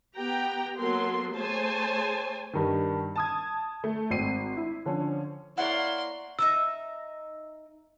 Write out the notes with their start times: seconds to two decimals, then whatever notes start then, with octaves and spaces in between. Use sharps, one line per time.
0.16 B3 G4 G5 A#5
0.78 F#3 A#3 B3 A4 A#4 C6
1.35 A3 G#4 C5 C#5 G#5 A5
2.53 G2 D#3
3.16 A5 D#6 G#6
3.84 A3
4.10 G#1 C4 C7 D#7
4.57 E4
4.86 D3 F3 C#4
5.58 A#3 E4 C#5 D5 F#5 C6
6.39 D#4 E5 A#5 E6